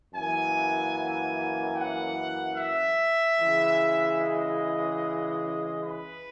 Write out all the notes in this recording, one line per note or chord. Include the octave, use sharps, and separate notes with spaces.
F#2 E3 A#3 G#5
G#5
F#5
E5
C#3 E3 G#3
D#5
B4